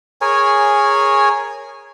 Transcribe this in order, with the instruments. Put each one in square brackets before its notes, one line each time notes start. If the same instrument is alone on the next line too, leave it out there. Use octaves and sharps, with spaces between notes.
[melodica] G#4 A#4 C#5 G#5